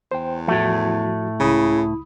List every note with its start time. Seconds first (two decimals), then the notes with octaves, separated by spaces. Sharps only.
0.11 E2 C5 G5
0.48 A2 F3 A3 F#4
1.40 C#2 C#3 E4 B5 D#6